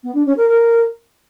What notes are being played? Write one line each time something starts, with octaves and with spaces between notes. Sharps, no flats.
B3
D4
C#4
A#4
A#4